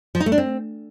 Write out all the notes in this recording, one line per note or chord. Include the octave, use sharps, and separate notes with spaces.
F3
D#4
A3
D4
C4